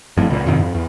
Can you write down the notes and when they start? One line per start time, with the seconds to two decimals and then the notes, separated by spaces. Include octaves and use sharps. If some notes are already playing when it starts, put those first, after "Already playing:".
0.17 F#1 F2 A2
0.30 C#2 A#2
0.46 F2 G#2 C3 D#3
0.59 F2
0.74 E2